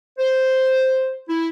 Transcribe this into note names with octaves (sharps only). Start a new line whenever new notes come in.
C5
E4